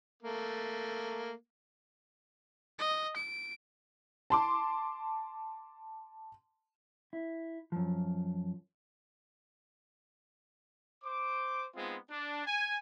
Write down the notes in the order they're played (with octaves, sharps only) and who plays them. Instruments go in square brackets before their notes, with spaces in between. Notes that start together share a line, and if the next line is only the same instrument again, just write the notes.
[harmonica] A3 A#3
[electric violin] D#5
D7
[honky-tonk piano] A5 C6 D6
[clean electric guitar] E4
F#2 F3
[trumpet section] C5 D6
G#3 B3 C4 D#4 F4
D4
G#5